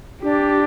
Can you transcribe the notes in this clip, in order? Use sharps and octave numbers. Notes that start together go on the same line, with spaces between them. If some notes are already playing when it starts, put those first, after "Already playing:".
D4 G4